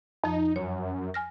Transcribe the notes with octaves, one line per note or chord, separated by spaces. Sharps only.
F2 F3 D#4
F#2 C#5
G#5 F6 A#6